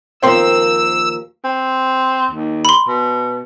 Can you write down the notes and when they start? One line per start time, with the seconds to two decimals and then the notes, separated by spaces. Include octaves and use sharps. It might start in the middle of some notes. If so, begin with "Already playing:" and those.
0.22 D#2 F3 C4 A#4 G5 C6 E6
1.44 C4
2.31 D#2
2.65 B5 C6
2.87 B2